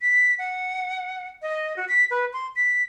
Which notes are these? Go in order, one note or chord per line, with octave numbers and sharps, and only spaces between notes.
B6
F#5
D#5
F#4
B6
B4
C6
B6